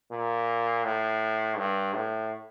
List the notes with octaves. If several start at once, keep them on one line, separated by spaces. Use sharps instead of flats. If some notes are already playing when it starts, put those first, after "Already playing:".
A#2
A2
G2
A2